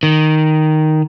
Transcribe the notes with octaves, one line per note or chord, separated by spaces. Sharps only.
D#3